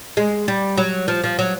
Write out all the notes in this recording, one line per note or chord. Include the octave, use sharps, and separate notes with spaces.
G#3
G3
F#3
F3
F3
F#3